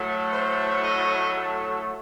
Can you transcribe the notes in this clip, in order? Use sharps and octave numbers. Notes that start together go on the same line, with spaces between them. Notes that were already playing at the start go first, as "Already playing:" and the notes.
Already playing: A2 F#3 A3
C5
D#5
A4